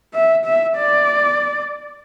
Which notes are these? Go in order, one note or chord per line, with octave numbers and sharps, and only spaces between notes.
E5
E5
D5